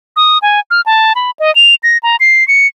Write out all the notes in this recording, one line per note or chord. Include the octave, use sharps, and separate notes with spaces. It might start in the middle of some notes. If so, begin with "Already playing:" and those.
D#6
G#5
F6
A5
B5
D#5
F7
A#6
A#5
C7
C#7